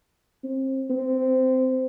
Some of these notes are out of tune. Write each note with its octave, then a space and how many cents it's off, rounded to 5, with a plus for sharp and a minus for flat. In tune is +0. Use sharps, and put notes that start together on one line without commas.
C4 +30
C4 -15